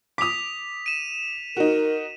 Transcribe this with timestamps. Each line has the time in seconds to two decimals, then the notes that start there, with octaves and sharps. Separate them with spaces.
0.18 D6 D#6 B6 F7
0.86 D#7 E7
1.57 D#4 F#4 A#4